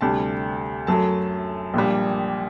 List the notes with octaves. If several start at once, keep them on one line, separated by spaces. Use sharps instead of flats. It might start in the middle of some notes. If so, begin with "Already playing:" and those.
D2 C3 G3 A5
F#2 F#3 A3 A5
A#1 A#2 G3